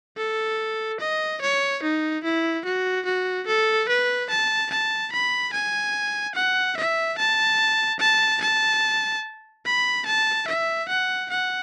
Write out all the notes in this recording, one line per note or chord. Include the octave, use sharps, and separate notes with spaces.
A4
D#5
C#5
D#4
E4
F#4
F#4
A4
B4
A5
A5
B5
G#5
F#5
E5
A5
A5
A5
B5
A5
E5
F#5
F#5